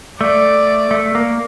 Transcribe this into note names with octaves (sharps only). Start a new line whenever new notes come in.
A3 D5
A3
A#3